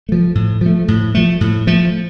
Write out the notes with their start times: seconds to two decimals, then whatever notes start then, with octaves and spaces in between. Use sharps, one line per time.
0.09 F3 A3
0.35 A2
0.61 F3 A3
0.88 A2
1.15 F3 A3
1.41 A2
1.67 F3 A3